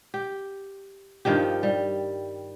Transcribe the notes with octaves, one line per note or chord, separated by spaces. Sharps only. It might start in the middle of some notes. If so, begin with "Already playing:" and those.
G4
G2 D#3 F3 G4
G3